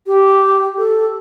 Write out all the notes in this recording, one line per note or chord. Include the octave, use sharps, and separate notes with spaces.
G4
A4